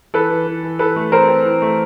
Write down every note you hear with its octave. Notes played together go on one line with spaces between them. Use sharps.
E3 A4 B4
E3
E3
E3
E3 A4 B4
A3
C4 A#4 C5
C4
E3
A3